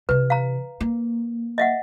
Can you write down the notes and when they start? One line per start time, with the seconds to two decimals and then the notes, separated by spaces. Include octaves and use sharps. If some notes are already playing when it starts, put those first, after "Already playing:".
0.09 C3 E3 B4
0.30 F5 A#5
0.81 A#3
1.58 D#5 E5 F#5